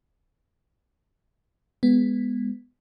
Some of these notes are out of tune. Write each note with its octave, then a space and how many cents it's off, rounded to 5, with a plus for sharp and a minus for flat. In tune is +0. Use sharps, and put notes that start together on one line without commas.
G#3 -15 B3 +0